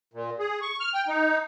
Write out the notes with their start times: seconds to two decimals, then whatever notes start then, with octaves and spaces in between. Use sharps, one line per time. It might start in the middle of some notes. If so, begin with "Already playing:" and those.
0.14 A#2
0.39 G#4
0.62 C#6
0.80 F6
0.94 G5
1.07 D#4